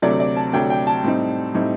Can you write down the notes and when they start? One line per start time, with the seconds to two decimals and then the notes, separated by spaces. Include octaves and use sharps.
0.02 D2 C3 F#3 A3 D5
0.20 D5
0.36 A5
0.53 D2 C3 F#3 A3 G5
0.70 G5
0.87 A5
1.04 A2 G3 C4 D#4
1.55 A2 G3 C4 D#4